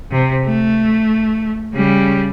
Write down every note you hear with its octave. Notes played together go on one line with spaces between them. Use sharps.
C3
A3
C#3 G3